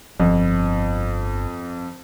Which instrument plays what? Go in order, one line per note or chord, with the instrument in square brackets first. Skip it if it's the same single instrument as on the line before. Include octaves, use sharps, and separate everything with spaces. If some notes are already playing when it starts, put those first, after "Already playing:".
[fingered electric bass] G1 [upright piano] F2